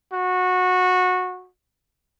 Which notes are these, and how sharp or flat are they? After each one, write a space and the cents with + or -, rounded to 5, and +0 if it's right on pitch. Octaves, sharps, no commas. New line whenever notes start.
F#4 -20